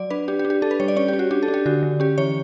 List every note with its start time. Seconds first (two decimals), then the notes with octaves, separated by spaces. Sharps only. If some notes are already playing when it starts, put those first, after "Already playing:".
Already playing: F#3 D5
0.10 D4 B4
0.28 D4 G4
0.39 G4
0.45 D4
0.50 G4
0.62 D4 A4
0.71 B4
0.80 G3 C#5
0.88 D5
0.96 C#4 C#5
1.08 G4
1.13 C#4
1.19 F#4
1.31 D4 G4
1.43 A4
1.48 D4
1.54 G4
1.66 D3 F#4
1.83 D3
2.00 C#4 G4
2.18 E3 C#5